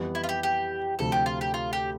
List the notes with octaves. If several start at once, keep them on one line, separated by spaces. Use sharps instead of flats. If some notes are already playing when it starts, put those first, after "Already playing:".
Already playing: F2 E3 G3 B3
E4
F4
G4
G4
D2 C3 F3 A4
G4
F4
G4
F4
G4